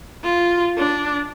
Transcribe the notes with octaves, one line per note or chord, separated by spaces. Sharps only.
F4
D4